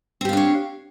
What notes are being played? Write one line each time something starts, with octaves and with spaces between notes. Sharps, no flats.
C4 D4 G4 C#5 F5